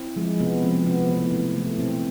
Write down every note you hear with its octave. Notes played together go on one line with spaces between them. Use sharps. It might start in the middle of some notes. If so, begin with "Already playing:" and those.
Already playing: C4 E4
F3 G#3
C3 B3
F3 G#3 C4
C3 B3
E3 A3
C3
E3 A3
B2 C4